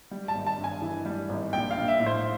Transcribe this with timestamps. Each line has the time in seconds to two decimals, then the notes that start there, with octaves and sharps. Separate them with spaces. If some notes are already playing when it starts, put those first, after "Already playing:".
0.11 G3
0.28 A5
0.35 G#1
0.47 A5
0.58 G2
0.64 G#5
0.82 E3
1.06 G3
1.29 G#1
1.53 A#1 G5
1.71 F5
1.77 A#1
1.88 E5
2.00 A2
2.06 C5